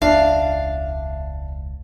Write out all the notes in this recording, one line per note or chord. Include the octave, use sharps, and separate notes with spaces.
E1 C#2 D4 E5 F5